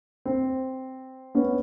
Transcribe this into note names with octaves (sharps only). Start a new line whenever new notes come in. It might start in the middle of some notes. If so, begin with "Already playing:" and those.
C4
B3 C#4